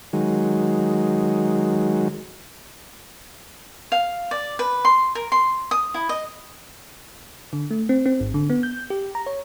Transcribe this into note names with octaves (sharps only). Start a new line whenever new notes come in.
D#3 F#3 G#3
F5
D5
B4
C6
A#4
C6
D#6
E4
D#5
D3
A3
C4
C4
G#1
D3
B3
G6
G4
A#5
C#5